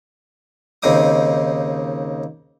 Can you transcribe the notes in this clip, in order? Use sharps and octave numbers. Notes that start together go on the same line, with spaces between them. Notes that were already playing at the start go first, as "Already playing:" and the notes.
D#2 C#3 C4 D#4 D6 D#6